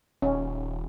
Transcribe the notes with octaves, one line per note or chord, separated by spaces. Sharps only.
D#1 C#4